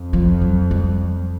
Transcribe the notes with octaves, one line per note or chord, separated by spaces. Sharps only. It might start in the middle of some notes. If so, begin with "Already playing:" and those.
Already playing: F2
F3
F#3
G3